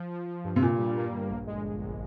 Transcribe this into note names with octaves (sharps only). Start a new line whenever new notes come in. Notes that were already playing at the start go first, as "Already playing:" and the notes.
Already playing: F3
F3
F3
G2
C3
G2 A#2
G3
A#3
G1
A#1
G#3
G#3
A#1